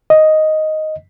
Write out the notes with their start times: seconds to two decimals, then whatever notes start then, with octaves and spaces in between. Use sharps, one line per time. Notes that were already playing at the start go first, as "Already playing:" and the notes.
0.10 D#5